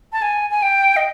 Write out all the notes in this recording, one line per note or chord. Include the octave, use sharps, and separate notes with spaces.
A5
G#5
G#5
G5
D#5